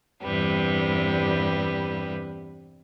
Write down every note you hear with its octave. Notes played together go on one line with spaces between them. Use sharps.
E2 G2 C3 G3 B4